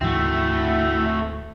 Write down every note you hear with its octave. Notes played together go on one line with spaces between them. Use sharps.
D2 G#2 E3 A3 C4 E4 F#4 E5